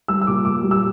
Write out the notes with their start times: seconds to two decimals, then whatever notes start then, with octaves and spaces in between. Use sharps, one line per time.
0.08 G3 E6
0.21 E6
0.27 A#2 D6
0.45 A#2 D6
0.63 G3
0.71 E6